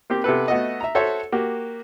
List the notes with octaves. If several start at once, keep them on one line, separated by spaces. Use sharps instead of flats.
A#3 C4 G4
C3 B3 A4 B4
A3 B3 F#4 A4 D#5
E5 A#5
F#4 A4 C5 C#5 E5
A#3 F#4 G4